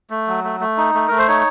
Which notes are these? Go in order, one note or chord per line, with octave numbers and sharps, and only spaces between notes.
A3
F#3
A3
A3
D#4
A3
A3 A#4
C5
D#4 C#5